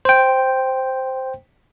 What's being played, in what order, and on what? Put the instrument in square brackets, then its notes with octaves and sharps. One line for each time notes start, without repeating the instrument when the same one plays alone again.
[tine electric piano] C5 G5